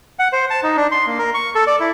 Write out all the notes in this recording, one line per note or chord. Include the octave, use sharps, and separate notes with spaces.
F#5
C5
A5
D#4
D4
C6
A#3
A#4
C#6
A4
D5
E4